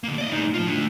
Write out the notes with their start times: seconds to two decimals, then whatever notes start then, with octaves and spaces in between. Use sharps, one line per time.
0.04 D3 A#3
0.18 D5 D#5
0.31 A2 D#4
0.54 F4 C5
0.67 A3 D4